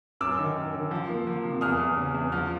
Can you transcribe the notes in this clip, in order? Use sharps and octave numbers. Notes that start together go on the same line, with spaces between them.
F#2 D6 E6
D#3
F#2
D#3
F3
A#3
F3
C3
E2 D#6 F6
E2
C#3
E2
F3 F6